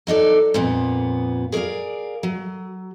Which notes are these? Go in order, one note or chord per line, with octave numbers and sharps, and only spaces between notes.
F#3 D#4 A4 D5
F2 A#2 B3
G#4 A#4 C#5 D5 F5
F#3